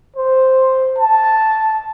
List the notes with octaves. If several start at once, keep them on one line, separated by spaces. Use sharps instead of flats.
C5
A5